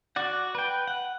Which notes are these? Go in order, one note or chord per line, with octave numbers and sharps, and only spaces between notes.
F#4 D5 F#5
B4 G5
F#5